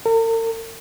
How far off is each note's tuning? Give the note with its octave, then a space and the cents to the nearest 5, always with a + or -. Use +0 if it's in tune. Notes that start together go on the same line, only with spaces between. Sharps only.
A#4 -45